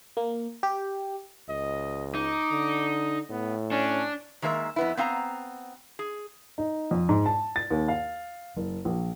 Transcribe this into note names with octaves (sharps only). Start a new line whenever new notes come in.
A#3
G4
C#2 D#5
D#4 D6
D3
A2 B3
C#4 D4
D#3 G#3 A#3 C#5 E5
F2 B3 E4
B3 C4 F5 G#5 A#5
G#4
D#4
F2
G#2
A5
A6
D#2
F5
F#1
A#1